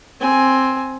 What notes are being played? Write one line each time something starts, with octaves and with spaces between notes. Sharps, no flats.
C4 G#5